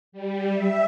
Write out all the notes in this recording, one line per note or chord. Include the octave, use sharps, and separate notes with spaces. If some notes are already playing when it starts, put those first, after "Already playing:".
G3
E5